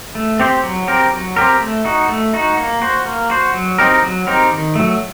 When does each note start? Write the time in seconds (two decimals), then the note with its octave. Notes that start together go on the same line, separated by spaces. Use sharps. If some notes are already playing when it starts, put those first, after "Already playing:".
0.15 A3
0.40 C4 G4 C5
0.64 F#3
0.88 C4 G4 A#4
1.12 F#3
1.36 C4 G4 A#4
1.60 A3
1.85 D#4 F#4
2.09 A3
2.34 D#4 F#4
2.57 A#3
2.82 F#4 C5
3.06 A#3
3.30 F#4 C5
3.54 F#3
3.78 C4 D#4 G4 A#4
4.03 F#3
4.27 C4 D#4 G4 A#4
4.51 D#3
4.75 F#3 A3